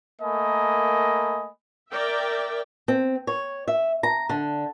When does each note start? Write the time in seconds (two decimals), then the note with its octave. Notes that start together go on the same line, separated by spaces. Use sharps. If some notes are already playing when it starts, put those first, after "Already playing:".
0.22 A3 A#3 A#4 D#5 G#5 B5
1.92 A#4 D5 E5 G5
2.88 C4
3.27 C#5
3.68 E5
4.03 A#5
4.29 D3